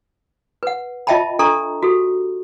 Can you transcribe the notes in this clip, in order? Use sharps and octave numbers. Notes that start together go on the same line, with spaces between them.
B4 F#5
F4 D#5 E5 G5 A5 B5
D4 A4 A#5 C#6
F#4 G4 A4